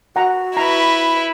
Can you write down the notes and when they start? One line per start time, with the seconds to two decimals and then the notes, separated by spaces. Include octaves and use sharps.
0.16 F#4 F#5 A#5
0.57 E4 B4 A#5